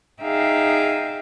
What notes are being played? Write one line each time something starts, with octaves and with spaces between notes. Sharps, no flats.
D#4 G#4 E5 F5 G5 A#5